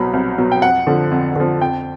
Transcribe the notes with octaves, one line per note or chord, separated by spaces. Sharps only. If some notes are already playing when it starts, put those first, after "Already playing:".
Already playing: C2 B2 F#3 B5
C2
B2 F#3
G5
F2 F#5
D3 F3
F2
D3 F3
F2 G5